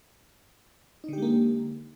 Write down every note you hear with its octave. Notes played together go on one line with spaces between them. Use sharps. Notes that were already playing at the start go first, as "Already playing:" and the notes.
D3 G#3 A#3 D#4 G4